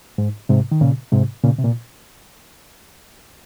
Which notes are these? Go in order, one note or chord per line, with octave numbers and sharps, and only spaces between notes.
G#2
G#2 C3
D#3
A#2 C#3
G#2 C3
A#2 C#3
C3
A#2